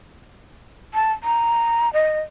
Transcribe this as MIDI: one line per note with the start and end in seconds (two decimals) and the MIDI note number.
0.94 1.12 81
1.24 1.92 82
1.93 2.20 75